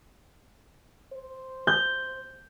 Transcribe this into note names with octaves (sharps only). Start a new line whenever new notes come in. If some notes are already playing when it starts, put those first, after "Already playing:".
C5
G6